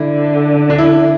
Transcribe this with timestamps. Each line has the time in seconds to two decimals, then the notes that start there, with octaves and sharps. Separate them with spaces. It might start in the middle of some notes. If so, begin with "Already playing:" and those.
Already playing: D3 E4
0.70 D4
0.78 E4